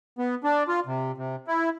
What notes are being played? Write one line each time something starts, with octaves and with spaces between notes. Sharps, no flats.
B3
D4
F4
C3
C3
E4